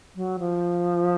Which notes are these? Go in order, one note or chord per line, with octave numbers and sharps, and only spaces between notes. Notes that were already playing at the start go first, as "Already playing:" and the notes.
F#3
F3